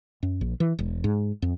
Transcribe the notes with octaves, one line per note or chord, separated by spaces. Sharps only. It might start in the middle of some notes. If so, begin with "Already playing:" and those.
F#2
A#1
E3
E1
G#2
F2